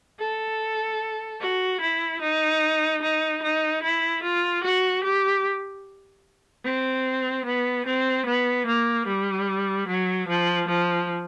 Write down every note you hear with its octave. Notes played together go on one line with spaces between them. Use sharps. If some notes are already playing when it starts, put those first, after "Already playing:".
A4
F#4
E4
D#4
D#4
D#4
E4
F4
F#4
G4
C4
B3
C4
B3
A#3
G3
F#3
F3
F3